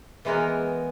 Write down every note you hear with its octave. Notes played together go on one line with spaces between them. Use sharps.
E3 G#3 B3 G#4 A#4